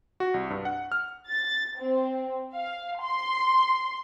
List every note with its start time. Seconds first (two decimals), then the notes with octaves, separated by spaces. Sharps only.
0.20 F#4
0.34 C2
0.50 G2
0.65 F#5
0.92 F6
1.29 A6
1.78 C4
2.56 F5
3.03 C6